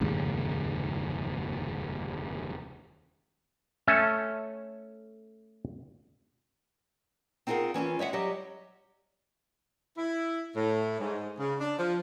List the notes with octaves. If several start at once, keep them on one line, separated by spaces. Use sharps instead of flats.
F1 D#2 G#2 C#3
A3 C#4 A4 C#5 E5 G#5
C4 D#4 F4 G#4 A#4 F#5
E3 C#4 D#4 F4
G#3 C#5 E5 F#5
F#3 G3 G4 D#5
E4
A2
G#2
C#3
D4
F3